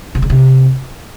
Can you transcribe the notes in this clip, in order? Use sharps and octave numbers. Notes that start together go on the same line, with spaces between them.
C3
C#3
C3